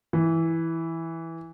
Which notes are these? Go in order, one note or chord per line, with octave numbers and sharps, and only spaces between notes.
E3